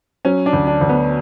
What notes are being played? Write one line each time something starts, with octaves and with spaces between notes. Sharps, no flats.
F#3 C#4
D4
D2
D4
D2
B3